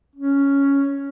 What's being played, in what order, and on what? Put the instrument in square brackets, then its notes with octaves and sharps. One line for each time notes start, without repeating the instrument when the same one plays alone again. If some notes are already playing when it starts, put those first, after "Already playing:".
[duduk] C#4